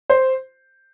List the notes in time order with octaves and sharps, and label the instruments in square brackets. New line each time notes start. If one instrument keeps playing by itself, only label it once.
[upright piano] C5